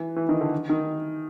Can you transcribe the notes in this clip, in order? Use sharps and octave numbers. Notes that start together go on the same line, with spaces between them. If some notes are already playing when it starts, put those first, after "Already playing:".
Already playing: E3
E3
D#3
D3
D#3